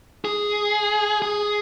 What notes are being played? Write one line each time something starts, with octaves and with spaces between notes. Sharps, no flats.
G#4
G#4